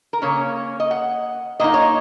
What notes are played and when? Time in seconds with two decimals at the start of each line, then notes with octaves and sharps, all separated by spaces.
0.13 A#4
0.22 C#3 A#3 C#4 C#5
0.80 D#5
0.91 F#5
1.60 A#2 A#3 D#4 D#5
1.74 C#5